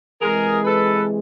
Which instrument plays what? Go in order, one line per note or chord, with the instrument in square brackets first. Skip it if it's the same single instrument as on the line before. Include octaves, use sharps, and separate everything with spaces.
[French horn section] C3 E3 G#3 [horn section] G#4 A#4
[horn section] A4 B4